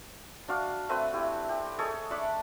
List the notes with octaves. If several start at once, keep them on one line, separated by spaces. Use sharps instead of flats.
D4 F#4 D5 F5
A3 C4 B4
E4 G4
G4
G#4 A4 C#5 D#5
A3 D4 B5 D6